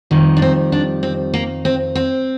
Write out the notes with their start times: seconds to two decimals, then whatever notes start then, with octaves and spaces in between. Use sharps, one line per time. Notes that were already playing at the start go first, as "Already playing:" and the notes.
0.11 F2 D#3 G3
0.37 D4
0.42 C4
0.72 D4
1.03 C4
1.34 A#3
1.65 C4
1.95 C4